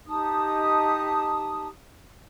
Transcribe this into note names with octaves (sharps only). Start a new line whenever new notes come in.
D#4 G4 A5 D#6